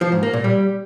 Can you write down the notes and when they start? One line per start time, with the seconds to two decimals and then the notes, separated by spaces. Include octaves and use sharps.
0.01 F3
0.12 G#2
0.23 A#3
0.33 A#2
0.44 G3